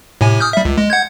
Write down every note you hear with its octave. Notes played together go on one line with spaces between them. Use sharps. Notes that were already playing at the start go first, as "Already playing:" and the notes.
A2 C3 G#5
D#6 F6 G6
G3 E5
C#2
G#3
F#5 G6 G#6